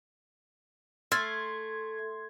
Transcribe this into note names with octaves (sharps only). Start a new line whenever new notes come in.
A3 C6 E6 F6 G#6 A6